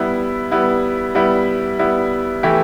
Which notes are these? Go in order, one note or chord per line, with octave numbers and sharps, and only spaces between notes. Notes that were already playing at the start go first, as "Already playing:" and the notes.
Already playing: G3 B3 E4
G3 B3 E4
G3 B3 E4
G3 B3 E4
E3 A3 E4 G4